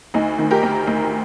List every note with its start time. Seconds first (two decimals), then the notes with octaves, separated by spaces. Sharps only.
0.14 D2 D#4
0.39 D#3
0.51 G4 A#4
0.63 D2
0.87 D2